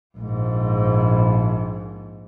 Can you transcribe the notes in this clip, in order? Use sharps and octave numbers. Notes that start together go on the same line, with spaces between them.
A#1 G#2